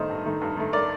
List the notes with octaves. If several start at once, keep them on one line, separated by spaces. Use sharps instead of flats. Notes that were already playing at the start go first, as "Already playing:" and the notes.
Already playing: D#3 A3 A#4 C5 D#5
G2
D#3 A3
G2
D#3 A3
A#4 D5